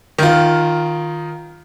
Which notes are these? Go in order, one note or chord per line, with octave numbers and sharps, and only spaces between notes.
D#3 F4